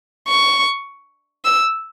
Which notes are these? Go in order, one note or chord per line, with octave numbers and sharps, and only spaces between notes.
C#6
E6